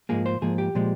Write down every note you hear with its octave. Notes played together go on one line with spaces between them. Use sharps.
G#2 F3 A#3 G#4
C5
G#2 F3 A#3 G#4
G4
A#2 F3 G#3